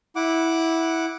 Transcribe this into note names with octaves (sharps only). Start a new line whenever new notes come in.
E4 F#5 D6